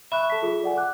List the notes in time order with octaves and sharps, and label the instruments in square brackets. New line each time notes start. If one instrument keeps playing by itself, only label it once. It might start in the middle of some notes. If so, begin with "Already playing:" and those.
[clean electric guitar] E5 [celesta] B5 C#6 F#6
[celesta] A4 A5 B6
F4 G#4 A4
D5 F#5 G#5
D6 F#6